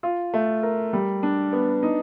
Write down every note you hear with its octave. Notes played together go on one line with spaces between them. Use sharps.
F4
A3
A#4
G3
D4
B3
D#4